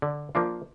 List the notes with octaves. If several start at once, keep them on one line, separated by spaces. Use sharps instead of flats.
D3
F3 A#3 D4 F4